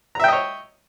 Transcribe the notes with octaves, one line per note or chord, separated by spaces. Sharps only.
C#5 D#5 E5 G5 A#5